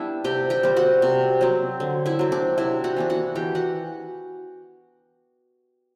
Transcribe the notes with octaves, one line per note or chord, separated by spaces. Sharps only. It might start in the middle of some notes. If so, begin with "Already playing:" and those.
Already playing: G3 B3 D4 E4 E5
C3 G4 G5
G4 G5
G3 C4
F#4 F#5
C3
F#3 C4
D3
E4 E5
F#3 C4
D4 D5
C3 E4 E5
F#4 F#5
E3 B3 D4
F#4 F#5
E3 G4 G5
F#4 F#5